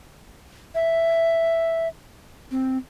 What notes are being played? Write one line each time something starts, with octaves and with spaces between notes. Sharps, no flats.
E5
C4